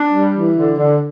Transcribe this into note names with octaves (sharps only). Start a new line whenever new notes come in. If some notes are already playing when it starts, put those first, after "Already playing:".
Already playing: D4
G3
E3
D3
D3